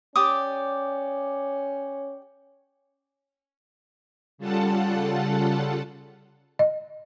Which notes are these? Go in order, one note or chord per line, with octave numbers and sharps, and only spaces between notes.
C#4 G4 D5 D#6
C#3 G3 F4 A4 F#5 A5
D#5